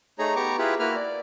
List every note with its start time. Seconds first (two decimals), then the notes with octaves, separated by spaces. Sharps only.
0.19 A3 D#4 G#4 C#5 A#5
0.36 B3 G4 A#5 C#6 D6
0.58 E4 F4 G4 G#4 B4
0.79 A#3 E4 F#4 B4 F6
0.95 D5